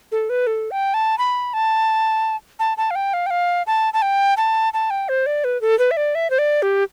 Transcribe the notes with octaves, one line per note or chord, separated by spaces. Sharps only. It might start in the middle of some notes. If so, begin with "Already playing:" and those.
A4
B4
A4
G5
A5
B5
A5
A5
A5
F5
G5
F5
G5
F5
A5
A5
G5
A5
A5
G5
C5
D5
B4
A4
B4
E5
D5
E5
C5
D5
G4